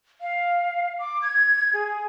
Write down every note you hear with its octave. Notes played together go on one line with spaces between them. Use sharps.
F5
D6
G#6
G#4